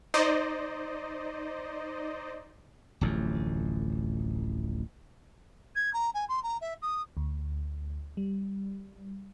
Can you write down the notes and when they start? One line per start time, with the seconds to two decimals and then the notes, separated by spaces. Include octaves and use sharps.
0.14 D#4 C5 D5 D#5
3.01 D1 A1 F2
5.76 G#6
5.94 A#5
6.14 G#5
6.29 C6
6.43 A#5
6.61 E5
6.82 D#6
7.17 D2
8.17 G3